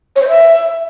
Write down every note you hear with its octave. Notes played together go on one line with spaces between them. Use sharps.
C#5
C5
E5